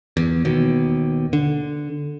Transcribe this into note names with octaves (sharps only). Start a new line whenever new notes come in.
E2
D#2 B2
D3